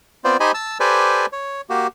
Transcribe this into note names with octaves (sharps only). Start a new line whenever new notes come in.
B3 C4 F4 C5 D5
D#4 G4 C5 D#5 G#5 B5
A5 E6
G4 A4 B4 C5 D5 G#5
C#5
A#3 F#4 G4